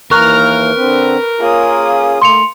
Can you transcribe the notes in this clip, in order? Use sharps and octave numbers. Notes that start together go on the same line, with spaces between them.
D#2 E3 A#3 A#4 C#6 F6 F#6
D3 C4 B4
A#3 C#4 F4 G#4 D#6
A3 C6 C#7 F7